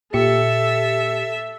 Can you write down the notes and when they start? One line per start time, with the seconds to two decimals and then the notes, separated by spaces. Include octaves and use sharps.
0.14 A#2 G4 A4 E5 C#7